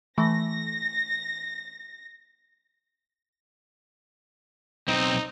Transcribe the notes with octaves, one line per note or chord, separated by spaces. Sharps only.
E3 A3 A#6
B1 C4 D#4